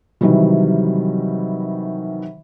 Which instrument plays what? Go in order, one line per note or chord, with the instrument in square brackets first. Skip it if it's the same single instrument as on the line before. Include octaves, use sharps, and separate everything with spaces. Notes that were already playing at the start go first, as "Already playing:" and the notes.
[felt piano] C3 D#3 E3 F#3 G3